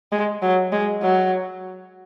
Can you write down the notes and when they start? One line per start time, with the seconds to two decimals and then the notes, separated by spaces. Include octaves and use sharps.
0.12 G#3
0.42 F#3
0.72 G#3
1.02 F#3